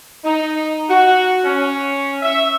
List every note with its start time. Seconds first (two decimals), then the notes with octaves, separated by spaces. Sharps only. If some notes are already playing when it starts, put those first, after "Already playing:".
0.24 D#4
0.89 F#4
1.45 C#4
2.22 E5